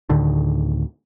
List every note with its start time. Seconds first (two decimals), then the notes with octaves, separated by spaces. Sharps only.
0.09 D2 A2 D3 D#3